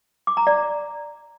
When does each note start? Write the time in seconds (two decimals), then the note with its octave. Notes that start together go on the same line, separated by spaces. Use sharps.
0.27 D6
0.37 A#5
0.47 D5